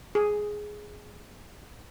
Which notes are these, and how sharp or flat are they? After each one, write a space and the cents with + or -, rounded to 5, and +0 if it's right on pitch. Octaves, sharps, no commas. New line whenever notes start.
G#4 +5